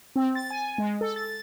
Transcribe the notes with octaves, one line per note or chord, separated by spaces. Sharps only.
C4
A6
G#5
G#3
A4
A6